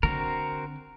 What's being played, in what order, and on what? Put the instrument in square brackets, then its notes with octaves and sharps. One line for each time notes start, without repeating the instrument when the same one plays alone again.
[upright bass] D3 [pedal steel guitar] C4 F#4 A#4